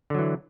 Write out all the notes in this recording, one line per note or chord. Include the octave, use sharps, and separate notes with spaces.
D3 E3 F#3